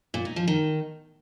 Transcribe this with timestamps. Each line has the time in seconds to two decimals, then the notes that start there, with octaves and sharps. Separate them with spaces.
0.14 A#2
0.25 D#4
0.36 F3
0.48 D#3